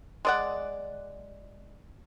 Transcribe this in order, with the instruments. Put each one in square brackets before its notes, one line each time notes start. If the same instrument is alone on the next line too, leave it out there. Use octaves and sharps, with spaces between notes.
[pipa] G#3 D5 F#5